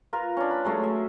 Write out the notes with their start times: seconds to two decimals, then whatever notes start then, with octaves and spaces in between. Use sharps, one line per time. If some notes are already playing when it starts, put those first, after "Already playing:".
0.13 F4 A#4 B4
0.37 C#4 D4
0.51 B5
0.64 F#3 G#3 A3 C#4
0.83 E5